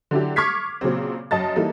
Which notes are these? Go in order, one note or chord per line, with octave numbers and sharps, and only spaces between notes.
D3 F#3 D4 E4 G4
C#6 D6 F6 G#6 B6 C7
A#2 C#3 F#3 C4
F#2 D#5 A5 A6
E3 G3 A#3 D#4 A4